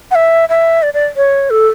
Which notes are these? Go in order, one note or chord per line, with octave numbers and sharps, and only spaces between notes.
F#5
E5
E5
D5
D5
C#5
A4